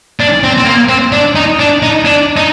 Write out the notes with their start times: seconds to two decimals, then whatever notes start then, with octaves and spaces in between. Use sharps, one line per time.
0.20 D4
0.43 C4
0.58 C4
0.65 A#3
0.89 C4
1.12 D4
1.35 D#4
1.59 D4
1.82 D#4
2.05 D4
2.37 D#4